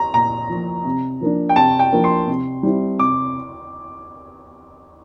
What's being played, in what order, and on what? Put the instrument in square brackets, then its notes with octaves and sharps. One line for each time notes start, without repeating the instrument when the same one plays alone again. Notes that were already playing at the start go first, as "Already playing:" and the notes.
Already playing: [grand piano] A#5
[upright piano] A#2 [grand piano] A#5
[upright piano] F3 A#3
C3
F3 A#3 D4
[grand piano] G5
[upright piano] C3 [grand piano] A5
[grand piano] G5
[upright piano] F3 A#3 D4
[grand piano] C6
[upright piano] C3
G3 C4 E4
[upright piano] C3 [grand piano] D6